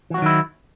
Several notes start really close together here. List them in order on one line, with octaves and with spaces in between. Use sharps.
E3 F#4 F#3 D#3 E4